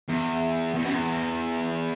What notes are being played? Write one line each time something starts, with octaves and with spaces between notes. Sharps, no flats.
E2
E2
F#2
E2